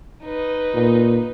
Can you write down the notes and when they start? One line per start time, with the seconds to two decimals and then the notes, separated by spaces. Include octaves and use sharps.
0.24 D#4 B4
0.75 A#2